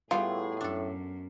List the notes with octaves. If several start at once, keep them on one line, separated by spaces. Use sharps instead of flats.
A2 G3 B3 F4 G#4 G5
F#2 D4 A4